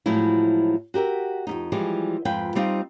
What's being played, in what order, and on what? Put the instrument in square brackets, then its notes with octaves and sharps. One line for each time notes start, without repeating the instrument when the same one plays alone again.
[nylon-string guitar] A2 F3 F#3 G#3 E4
F#4 G4 A#4 E5
F2 G#2 D#4
E3 F3 G3 G#3
F2 G#2 F4 B4 G5
G3 C4 D#4 F4